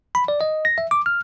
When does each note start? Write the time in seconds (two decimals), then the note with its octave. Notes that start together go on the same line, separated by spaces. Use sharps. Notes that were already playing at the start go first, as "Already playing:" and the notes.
0.15 B5
0.28 D5
0.41 D#5
0.65 A#6
0.78 E5
0.91 D6
1.06 F6